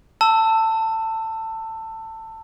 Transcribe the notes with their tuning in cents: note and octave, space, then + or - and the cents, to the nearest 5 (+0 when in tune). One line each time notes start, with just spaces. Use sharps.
A5 +20 E6 +5